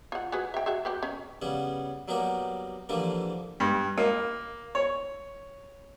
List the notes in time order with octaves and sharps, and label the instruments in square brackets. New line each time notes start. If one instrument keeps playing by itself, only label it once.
[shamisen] F4 F#5
F#4 G#4 B4
E5 G5
F#4 G#4 E5
F#4 G4 B4
C#4
[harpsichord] C#3 G3 B3 C#4
F#3 G3 A#3 B3 G4 A#4
D3 E3 F3 G3 A#3 D4
[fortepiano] G2
A#3
C#5